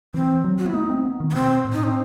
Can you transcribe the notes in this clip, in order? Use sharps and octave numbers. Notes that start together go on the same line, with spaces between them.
E3 C4
F#3
F#4
B3 E4
A3 D#4
C4
B3
D#3
B3
B2 C4
A2
D#4
C4